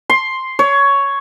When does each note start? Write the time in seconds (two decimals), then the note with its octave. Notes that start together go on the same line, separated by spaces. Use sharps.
0.10 C6
0.59 C#5